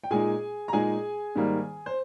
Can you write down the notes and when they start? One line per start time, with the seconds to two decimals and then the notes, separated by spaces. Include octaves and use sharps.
0.04 G5
0.11 A#2 G#3 D#4 G#4 G#5
0.68 A#5
0.73 A#2 G#3 D#4 G#4 G#5
1.35 G#2 D#3 G3 A#3 D#4
1.86 C5